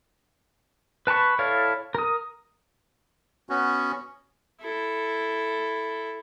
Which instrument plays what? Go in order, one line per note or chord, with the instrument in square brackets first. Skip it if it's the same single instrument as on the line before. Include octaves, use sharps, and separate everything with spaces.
[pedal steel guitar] B4 A5 B5 C#6
E4 A4 C#5 D5 F5
A#4 D#6
[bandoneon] B3 C#4 F#4
[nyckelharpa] E4 A4